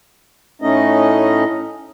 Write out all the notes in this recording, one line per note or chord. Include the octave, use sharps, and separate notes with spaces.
A2 A3 C#4 D#4 D#5